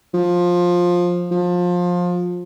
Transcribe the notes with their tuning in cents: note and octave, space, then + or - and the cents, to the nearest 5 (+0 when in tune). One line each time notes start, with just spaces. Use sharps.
F3 +15
F3 +25